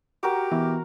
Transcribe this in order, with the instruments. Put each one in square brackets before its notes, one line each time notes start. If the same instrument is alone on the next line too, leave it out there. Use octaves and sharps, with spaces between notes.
[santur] F#4 A#4 D6 [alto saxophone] G4
[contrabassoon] B2 [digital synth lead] E3